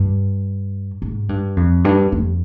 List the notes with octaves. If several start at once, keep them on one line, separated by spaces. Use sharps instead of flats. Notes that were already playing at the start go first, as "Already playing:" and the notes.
Already playing: G2
G#2
G2
F2
G2
F2